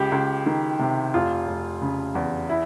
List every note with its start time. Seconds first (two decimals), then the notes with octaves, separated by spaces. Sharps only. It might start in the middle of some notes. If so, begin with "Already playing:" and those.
Already playing: C#2 G4
0.12 C#2
0.46 D#3
0.79 C3
1.14 F1 F4
1.48 F1
1.81 C#3
2.15 E2
2.49 E4